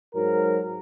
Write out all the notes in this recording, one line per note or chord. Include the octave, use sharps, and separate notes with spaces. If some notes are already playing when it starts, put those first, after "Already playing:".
G#2 F#3 A#4